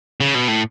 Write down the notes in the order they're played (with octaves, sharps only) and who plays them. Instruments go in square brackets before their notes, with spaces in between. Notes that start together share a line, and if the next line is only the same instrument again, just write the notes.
[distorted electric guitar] C#3
B2
A2